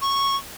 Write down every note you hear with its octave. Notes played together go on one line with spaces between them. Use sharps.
C#6